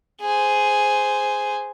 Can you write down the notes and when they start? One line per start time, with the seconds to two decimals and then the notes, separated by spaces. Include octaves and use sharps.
0.21 G#4 C5